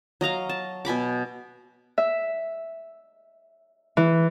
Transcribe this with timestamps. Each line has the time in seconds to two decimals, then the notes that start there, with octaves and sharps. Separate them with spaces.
0.21 F#3 D#5 F5 A#5
0.49 A5
0.85 B2 G#5 B5 D6
1.98 E5
3.97 E3